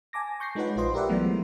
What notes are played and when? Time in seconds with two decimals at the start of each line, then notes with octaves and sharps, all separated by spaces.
0.13 G#5 A5 D6 A#6
0.40 C#6 G6 A#6 C7
0.55 G#3 D#4 F4 B4 C#5 F#5
0.76 A#1 F4 B4 C5 D#5 C6
0.94 G4 A#4 B4 D5 E5 F#5
1.09 E3 F#3 G#3 A3 B3